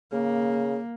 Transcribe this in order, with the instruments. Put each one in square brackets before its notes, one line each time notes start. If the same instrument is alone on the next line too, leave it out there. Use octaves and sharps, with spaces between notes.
[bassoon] C#3 [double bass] A#3